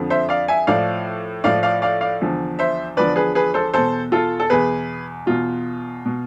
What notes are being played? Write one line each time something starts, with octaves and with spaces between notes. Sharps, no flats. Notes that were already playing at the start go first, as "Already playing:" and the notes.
Already playing: F2 D3 F3
C5 E5
D5 F5
E5 G#5
A2 F3 D5 F5
A2 F3 D5 F5
D5 F5
D5 F5
D5 F5
E2 D3 F3
C5 E5
E2 D3 F3 B4 D5
G#4 B4
G#4 B4
A4 C5
E2 B2 A4 C5
F4 A4
A4
E2 B2 G#4 B4
E2 B2 F4
B2